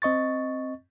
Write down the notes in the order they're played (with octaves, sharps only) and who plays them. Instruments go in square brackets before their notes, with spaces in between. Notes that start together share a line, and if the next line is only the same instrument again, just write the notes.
[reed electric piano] C4 D#5 C#6 A6